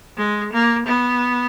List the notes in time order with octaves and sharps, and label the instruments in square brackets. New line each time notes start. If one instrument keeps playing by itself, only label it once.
[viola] G#3
A#3
B3